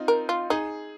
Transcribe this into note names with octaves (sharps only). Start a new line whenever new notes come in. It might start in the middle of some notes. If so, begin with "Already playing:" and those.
Already playing: C4 D#4 F4
A#4
F4
D#4 G#4